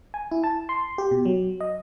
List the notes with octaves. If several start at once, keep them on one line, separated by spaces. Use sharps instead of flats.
G#5
E4
A5
C6
G4
B2
F#3
D#5